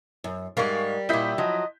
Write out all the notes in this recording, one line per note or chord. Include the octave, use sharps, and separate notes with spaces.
F#2
G#2 G3 G#3 A#4 F5 C#6
A#2 E4 D#5 G6 B6
F3 F#3 D#5